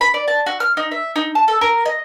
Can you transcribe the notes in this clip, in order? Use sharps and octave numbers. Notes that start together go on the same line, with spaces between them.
B5
D5
A5
F#4
F6
D#4
E5
D#4
A5
A4
A#4
D#5